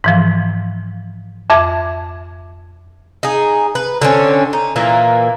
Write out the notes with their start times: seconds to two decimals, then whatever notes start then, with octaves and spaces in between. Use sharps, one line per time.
0.04 G#2 E3 F3
1.50 F2 E5 D6 G#6
3.23 D#4 G#4
3.75 B4
4.01 D3 C4 C#4
4.53 D#4
4.76 A#2 E3 A#3